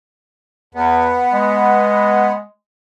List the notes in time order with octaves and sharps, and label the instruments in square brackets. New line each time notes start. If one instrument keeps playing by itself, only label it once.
[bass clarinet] E2 [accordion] B3
[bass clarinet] G#3